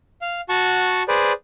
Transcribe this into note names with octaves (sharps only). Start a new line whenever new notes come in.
F5
F#4 F#5 A5 C#6
G#4 B4 C5 D5